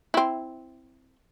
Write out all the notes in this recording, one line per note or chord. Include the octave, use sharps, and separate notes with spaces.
C4 E4